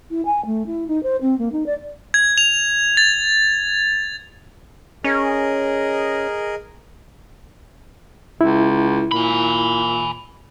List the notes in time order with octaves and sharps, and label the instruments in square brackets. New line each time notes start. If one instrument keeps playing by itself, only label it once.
[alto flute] E4
G#5
A3
E4
D#4
C5
C4
A#3
D#4
D5
[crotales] G#6
F7
A6
[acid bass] C#4 [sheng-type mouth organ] G#4 A#4 D#5
[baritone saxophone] C#2 [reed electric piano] E4
[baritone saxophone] A#2 [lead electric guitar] G#5 B5